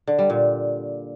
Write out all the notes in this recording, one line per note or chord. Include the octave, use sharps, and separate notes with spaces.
D3
G3
A#2